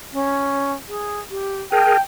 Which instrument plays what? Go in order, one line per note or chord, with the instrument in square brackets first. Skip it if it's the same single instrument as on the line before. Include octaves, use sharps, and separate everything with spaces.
[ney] C#4
G#4
G4
[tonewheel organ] G#4 A#4 [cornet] G5 [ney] A5